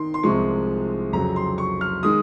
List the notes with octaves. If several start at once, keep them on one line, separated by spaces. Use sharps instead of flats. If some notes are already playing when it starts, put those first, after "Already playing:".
Already playing: D#3 C6
C6
C2 C3 F3 G#3 C#6
F2 C#3 F#3 A#5
C6
C#6
F6
D#3 G#3 D#6